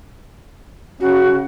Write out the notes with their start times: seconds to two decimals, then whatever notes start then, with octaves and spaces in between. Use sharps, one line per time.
1.00 C#3 F#4